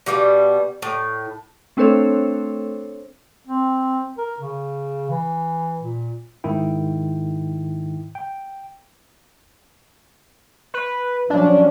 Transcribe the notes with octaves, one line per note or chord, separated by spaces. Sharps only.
B2 G3 A#3 B3
A2
A3 C4 D4 A4 C5 C#5
C4
A#4
C#3
E3
A#2
G#2 D#3 E4 G5
G5
B4
F3 F#3 C#4 D4